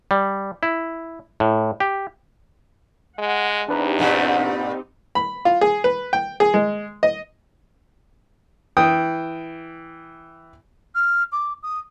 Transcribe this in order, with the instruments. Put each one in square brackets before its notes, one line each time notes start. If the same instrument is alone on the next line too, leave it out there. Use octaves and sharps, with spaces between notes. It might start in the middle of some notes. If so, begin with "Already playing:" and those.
[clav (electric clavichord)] G3
E4
A2
G4
[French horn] G#3 [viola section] F#5
[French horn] E2 [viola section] C4 D#4 G4 [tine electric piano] D4 B4 A#5
[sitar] G2 A#2 G3
[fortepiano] B5
F4
G#4
B4
G5
G#4
G#3
D#5
E3 G5 D#6
[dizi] F6
D6
D#6